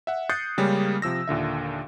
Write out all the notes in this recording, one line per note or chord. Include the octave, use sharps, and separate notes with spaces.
E5 F#5
D#6 F#6 G6 A6 C7 C#7
C#3 G3 G#3 A#3 C#4
C3 F3 E6 A#6
D#2 A#2 D3 E5